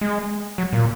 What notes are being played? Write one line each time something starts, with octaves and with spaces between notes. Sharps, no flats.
G#3
F#3
A#2